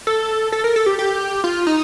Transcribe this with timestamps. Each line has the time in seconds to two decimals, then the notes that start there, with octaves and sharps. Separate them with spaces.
0.07 A4
0.52 A4
0.64 A#4
0.76 A4
0.86 G4
0.99 G4
1.44 F4
1.67 D#4